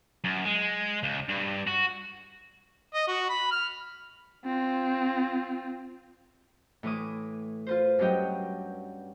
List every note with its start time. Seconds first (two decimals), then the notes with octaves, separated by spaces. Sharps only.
0.24 F#2
0.45 G#3
1.03 C#2
1.29 G2
1.68 F#4
2.94 D#5
3.08 F#4
3.30 B5
3.51 F6
4.45 C4 F4
6.83 A2 E3 B4 D6 D#6
7.67 F4 B4 C5
7.99 G2 F#3 C#4 G4 D#5 G5